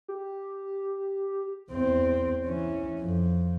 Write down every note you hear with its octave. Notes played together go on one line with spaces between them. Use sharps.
G4
E2 C4
E3 C#4
F2